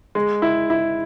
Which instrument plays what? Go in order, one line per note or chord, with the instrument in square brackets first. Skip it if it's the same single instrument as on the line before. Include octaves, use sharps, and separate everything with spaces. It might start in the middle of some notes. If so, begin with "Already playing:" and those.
[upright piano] G#3
E4
E4